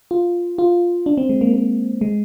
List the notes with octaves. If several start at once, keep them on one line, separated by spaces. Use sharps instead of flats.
F4
F4
D4
C4
G#3
A#3
A#3
G#3